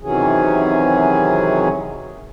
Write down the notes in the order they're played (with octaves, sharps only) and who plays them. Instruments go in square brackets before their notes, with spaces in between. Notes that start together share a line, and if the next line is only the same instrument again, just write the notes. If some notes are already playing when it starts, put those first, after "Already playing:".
[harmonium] C3 D#3 E3 F#3 C#4 G#4